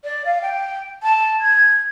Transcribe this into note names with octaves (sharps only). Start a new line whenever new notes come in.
D5
F5
G5
A5
G#6